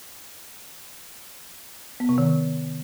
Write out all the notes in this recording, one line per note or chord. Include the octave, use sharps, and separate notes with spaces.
B3
C3
D#3